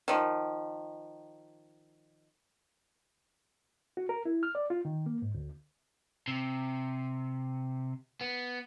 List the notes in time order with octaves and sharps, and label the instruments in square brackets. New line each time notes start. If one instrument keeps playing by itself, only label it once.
[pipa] D#3 F3
[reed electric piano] F#4
A#4
E4
F6
D5
F4
D#3
A#3
G#2
D2
[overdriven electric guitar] C3
B3